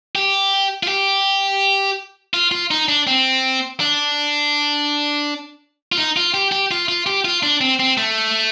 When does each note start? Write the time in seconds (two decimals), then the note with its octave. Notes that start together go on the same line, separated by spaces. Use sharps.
0.15 G4
0.83 F4
0.88 G4
2.34 F4
2.51 F4
2.71 D#4
2.88 D4
3.07 C4
3.80 D4
5.92 F4
5.97 D#4
6.17 F4
6.34 G4
6.52 G4
6.71 F4
6.88 F4
7.07 G4
7.25 F4
7.43 D4
7.61 C4
7.80 C4
7.97 A3